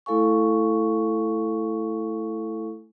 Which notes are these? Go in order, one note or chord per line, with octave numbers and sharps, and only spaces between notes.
A3 E4 A4 F5 G#5 C#6